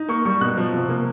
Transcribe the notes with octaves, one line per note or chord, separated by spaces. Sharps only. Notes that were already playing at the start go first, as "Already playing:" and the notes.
Already playing: D#4
A#3 C#6
G3 C#6
B2 F#6
F3
C3
A#3